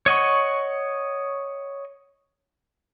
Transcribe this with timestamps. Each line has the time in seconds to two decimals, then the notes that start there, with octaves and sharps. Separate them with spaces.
0.06 C#5 D#5 F#5 C#6